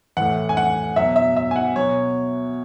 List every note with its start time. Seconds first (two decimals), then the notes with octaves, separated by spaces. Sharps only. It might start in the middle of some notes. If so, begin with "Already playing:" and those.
0.17 A2 E3 F#5
0.49 G#5
0.57 F#5
0.96 B2 F#3 E5
1.16 E5
1.36 E5
1.51 G#5
1.56 F#5
1.76 B2 F#3 C#5